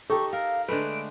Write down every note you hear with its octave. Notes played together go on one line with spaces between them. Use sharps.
D#4 G4 A4 C#6
A#4 F5
D3 G#3 A3 B4 D7